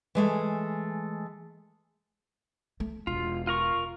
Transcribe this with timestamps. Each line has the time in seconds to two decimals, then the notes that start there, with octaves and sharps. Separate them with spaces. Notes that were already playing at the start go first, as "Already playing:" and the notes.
0.15 E3 G#3 A3
2.80 A3
3.07 E1 F4
3.47 F4 A#4 C#6